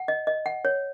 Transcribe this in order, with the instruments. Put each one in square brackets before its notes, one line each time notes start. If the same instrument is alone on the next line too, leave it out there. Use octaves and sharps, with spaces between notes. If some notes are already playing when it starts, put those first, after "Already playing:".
Already playing: [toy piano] F#5
D#5
D#5
F#5
C#5